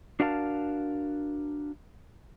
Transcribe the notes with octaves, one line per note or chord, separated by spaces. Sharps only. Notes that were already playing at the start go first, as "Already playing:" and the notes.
D4 F#4 A#4 F5 F#5 A5